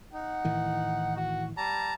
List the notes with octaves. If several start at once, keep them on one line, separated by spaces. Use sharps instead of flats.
D#4 F#5
A2 D#3 E3
F#4
G3 A5 A#5